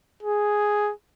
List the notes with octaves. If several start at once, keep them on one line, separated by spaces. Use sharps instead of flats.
G#4